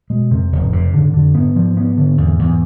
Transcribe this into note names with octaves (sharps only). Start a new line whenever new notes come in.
B2 G#3
F2 C3
F1 E2
G#2
F2 C3
G#2 D3
F2 D3
G#2 B3
F3
B3
D3
E2
E2